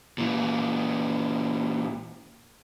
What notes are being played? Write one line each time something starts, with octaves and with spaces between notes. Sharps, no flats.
A#2 E3